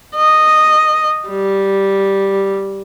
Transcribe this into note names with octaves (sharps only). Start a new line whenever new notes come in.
D#5
G3